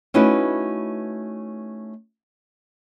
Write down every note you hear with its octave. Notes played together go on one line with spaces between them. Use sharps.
A3 C#4 D#4 E4 F#4 B4